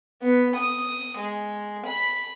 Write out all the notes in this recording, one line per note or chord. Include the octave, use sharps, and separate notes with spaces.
B3
D#6
G#3
B5